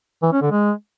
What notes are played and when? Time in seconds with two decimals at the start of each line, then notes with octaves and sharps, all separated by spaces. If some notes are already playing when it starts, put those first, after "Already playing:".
0.23 E3
0.32 C#4
0.42 D3
0.51 G#3